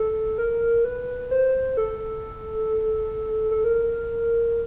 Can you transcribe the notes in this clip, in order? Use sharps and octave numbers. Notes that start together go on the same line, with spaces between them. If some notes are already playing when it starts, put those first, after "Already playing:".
Already playing: A4
A#4
B4
C5
A4
A4
A#4